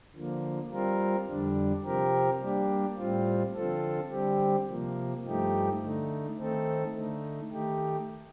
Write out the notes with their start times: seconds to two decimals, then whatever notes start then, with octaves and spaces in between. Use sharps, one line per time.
0.14 D3 F3 A#3
0.70 G3 C4 F4 A#4
1.27 F2 D3 G3 D4
1.84 C3 F3 C4 G4 A#4
2.40 G3 A#3 D4 G4
2.97 A2 G3 C4 F4
3.55 D3 F3 C4 F4 A4
4.10 D3 G3 C4 G4
4.68 C3 F3 A#3
5.24 G2 F3 A3 D#4 G4
5.81 D3 A3 D#4
6.37 D#3 A3 C4 D#4 A4
6.94 D3 A3 D#4
7.51 D#3 A3 D#4 G4